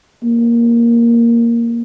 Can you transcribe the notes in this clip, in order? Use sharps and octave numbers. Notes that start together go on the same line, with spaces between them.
A#3